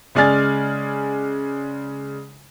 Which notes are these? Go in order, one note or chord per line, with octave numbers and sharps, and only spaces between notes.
C#3 G#3 D5 G#5 F6 A6